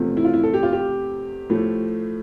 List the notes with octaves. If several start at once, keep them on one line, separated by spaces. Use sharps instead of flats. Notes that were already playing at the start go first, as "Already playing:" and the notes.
Already playing: E2 C3 F3 A3
E4
F4
E4
A4
G4
F4
G4
A2 F3 A3